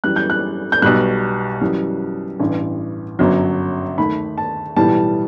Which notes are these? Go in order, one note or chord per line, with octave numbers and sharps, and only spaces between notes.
F#2 E3 G3 F#6
G6
F#6
G6
B1 B2 G3 F#6
F#2 E3 G3
A1 G2 E3
G1 F#2 F#3
D#2 D#3 A3 B5
A5
B1 A2 E3 G3 A5